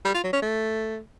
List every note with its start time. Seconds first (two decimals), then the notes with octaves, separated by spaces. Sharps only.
0.05 G3
0.14 F4
0.24 F#3
0.33 C#4
0.42 A3